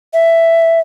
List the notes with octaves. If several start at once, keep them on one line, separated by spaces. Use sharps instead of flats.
E5